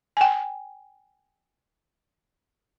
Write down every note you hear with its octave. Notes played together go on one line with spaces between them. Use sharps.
G5 G#5